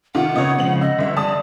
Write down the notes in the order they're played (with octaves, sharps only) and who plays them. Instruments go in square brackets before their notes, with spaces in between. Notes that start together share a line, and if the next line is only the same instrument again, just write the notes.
[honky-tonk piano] C3 D#3 F4 [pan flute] F#5
[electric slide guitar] C#3 B3 [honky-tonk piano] C#5 D#5
[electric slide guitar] C#3 F3 G#3 [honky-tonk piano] C4 F#7
[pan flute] D#5 [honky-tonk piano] E6
[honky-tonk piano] G1 E5 [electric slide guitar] D3 G3
[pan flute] D5 [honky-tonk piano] A5 D#6